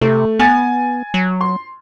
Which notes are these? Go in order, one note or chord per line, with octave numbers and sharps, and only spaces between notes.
C3 A3
B3 G#5 A6
F#3
C6